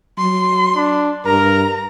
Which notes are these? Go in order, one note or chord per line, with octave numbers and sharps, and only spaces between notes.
F#3 C6
D4
G2 A#4 A#5